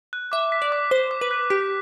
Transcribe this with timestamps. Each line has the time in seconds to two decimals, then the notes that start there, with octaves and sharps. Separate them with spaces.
0.13 F#6
0.32 E5 D6
0.52 B6
0.62 D5
0.72 D6
0.91 C5 D6
1.11 D6
1.21 B4
1.31 F#6
1.50 G4 B6